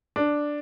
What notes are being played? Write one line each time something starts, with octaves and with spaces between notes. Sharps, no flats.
D4